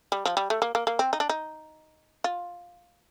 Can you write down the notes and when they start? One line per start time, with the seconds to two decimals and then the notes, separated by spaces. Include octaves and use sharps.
0.12 G3
0.26 F3
0.37 G3
0.50 A3
0.62 A#3
0.75 A#3
0.87 A#3
0.99 C4
1.13 D#4
1.20 D4
1.29 D#4
2.24 F4